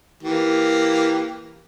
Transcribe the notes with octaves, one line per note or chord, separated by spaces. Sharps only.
E3 A#3 G4